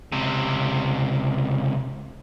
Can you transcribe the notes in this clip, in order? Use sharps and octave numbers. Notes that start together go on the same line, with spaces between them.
C#2 C3